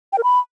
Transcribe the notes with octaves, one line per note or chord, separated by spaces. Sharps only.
G5
A#4
B5